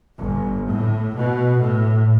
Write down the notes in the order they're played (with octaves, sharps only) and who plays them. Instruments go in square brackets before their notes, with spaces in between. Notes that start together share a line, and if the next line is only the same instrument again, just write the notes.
[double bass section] G1
A2
B2
A2